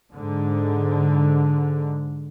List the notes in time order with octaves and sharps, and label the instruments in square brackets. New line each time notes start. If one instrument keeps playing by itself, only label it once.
[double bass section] G#2 D3